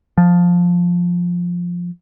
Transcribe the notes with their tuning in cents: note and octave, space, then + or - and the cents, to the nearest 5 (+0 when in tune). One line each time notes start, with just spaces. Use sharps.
F3 +10